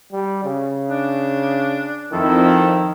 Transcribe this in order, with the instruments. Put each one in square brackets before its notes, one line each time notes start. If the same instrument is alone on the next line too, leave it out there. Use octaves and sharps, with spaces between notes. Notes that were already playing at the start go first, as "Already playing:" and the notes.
[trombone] G3
C#3
[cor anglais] D4
[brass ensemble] F2 E4 [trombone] D#3 [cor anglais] A4